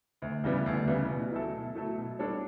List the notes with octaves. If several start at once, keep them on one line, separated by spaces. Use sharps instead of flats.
D2
C#3 E3 G3 B3
D2
C#3 E3 G3 B3
B2
F#3 A3 E4 A4
B2
F#3 A3 E4 A4
B2
G3 D4 A4 C#5